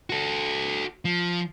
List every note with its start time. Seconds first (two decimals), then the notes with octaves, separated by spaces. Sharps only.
0.10 F#4 A4
1.05 F3